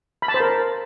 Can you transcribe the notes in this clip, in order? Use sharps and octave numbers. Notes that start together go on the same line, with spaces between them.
B5
A5
C5
A#4